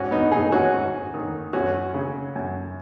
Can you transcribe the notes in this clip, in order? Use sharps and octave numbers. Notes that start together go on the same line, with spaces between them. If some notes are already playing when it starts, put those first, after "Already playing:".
Already playing: G#2 C#4 F#4
B3 D#4
D#3 D#4 G#4
C#4 F#4
G#2
D#3
F#2 C#4 F#4
C#3
F#2